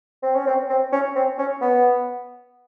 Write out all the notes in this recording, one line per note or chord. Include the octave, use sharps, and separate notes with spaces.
C4
C#4
C4
C4
C#4
C4
C#4
B3